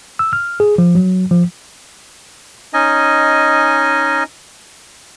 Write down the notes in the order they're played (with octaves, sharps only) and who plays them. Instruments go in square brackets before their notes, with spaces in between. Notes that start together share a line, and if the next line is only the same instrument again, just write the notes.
[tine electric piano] E6
F6
G#4
F3
F#3
F3
[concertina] C#4 D#4 D#5 G#5